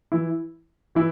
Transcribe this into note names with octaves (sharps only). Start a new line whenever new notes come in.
E3 E4
E3 E4